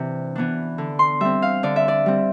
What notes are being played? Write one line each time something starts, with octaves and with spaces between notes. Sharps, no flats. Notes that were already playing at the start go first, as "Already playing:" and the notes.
Already playing: C3 E3 D4
E3 B3 D4
D3
C6
G3 C4 E5
F5
D3 D5
E5
D5
G3 C4